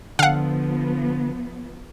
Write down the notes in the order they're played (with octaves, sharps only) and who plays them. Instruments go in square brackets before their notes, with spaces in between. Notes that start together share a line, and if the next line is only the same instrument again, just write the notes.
[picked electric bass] D3 [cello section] F3 B3 [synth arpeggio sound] F5 F#5